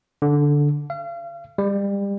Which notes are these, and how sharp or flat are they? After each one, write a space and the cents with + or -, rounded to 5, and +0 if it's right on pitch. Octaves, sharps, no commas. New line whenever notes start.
D3 -10
F5 -35
G3 +30